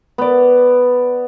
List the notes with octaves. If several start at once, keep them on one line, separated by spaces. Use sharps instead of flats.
B3 D5